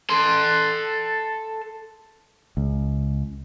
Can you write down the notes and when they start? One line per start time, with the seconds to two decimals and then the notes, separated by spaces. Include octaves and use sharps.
0.10 A4 C6
2.57 C#2